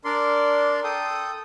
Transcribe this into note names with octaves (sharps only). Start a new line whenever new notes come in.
D4 A#4 D5 C6
A4 G5 D#6